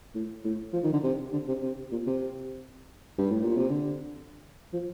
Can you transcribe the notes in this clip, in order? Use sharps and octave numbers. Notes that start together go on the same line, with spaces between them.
A2
A2
F3
D#3
D3
C3
D3
C3
C3
A#2
C3
G2
A2
A#2
C3
D3
F3